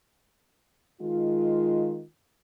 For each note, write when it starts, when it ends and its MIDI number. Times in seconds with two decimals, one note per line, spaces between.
1.02 2.03 51
1.02 2.03 56
1.02 2.03 65